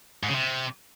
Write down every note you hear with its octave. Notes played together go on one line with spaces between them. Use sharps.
G#2
C#3
C3